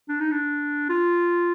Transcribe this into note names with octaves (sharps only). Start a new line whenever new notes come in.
D4
D#4
D4
F4